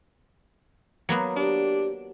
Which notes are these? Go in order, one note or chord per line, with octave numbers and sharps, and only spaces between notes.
F#3 A#3 B3
D4 G4